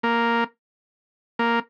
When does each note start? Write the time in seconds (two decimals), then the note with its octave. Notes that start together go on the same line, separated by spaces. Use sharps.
0.03 A#3
1.39 A#3